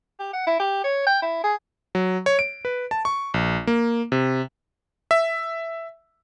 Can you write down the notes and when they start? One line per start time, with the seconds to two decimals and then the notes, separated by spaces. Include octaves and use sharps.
0.19 G4
0.33 F#5
0.47 E4
0.59 G4
0.84 C#5
1.07 G5
1.22 E4
1.44 G#4
1.95 F#3
2.26 C#5
2.39 D7
2.65 B4
2.91 A5
3.05 C#6
3.34 A#1
3.67 A#3
4.12 C3
5.11 E5